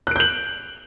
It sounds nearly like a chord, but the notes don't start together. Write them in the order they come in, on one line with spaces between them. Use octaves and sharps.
F#6 D7 G6 F#7